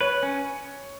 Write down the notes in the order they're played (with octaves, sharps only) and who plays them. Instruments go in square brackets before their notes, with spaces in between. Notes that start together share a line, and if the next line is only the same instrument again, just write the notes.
[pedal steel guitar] B4 [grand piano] C#5
[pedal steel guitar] C#4